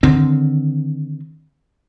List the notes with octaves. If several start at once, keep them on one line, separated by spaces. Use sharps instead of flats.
D3 D#3 C4